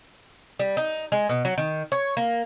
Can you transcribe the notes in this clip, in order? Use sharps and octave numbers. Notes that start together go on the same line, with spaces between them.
G3
D#4
G#3
B2
F#3
D#3
C#5
A#3